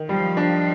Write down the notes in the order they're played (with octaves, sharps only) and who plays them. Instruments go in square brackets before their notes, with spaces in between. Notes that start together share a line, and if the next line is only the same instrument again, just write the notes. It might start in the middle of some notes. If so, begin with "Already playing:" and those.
Already playing: [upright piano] D#3
[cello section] F3 [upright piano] G3
[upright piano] D4